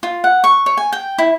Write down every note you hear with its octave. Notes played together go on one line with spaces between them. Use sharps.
F4
F#5
C#6
C#5
G#5
G5
E4